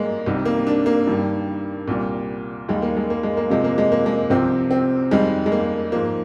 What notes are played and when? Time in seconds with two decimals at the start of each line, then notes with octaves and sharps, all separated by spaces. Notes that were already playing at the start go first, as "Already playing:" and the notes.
Already playing: G#2 D#3 G3 G#3 A#3
0.26 C2 C3 D#3 G3
0.45 A#3
0.67 D4
0.86 A#3
1.07 G2 D#3 G3
1.88 C2 A#2 G3
2.69 D#2 D#3 G3 G#3
2.82 A#3
2.97 G#3
3.10 A#3
3.23 G#3
3.37 A#3
3.49 F2 C3 F3 G#3
3.64 A#3
3.78 G#3
3.92 A#3
4.06 G#3
4.30 C2 C3 F3 C4
4.71 C4
5.11 F2 D#3 G3 G#3
5.46 G#3
5.52 A#3
5.92 G#2 F3 A#3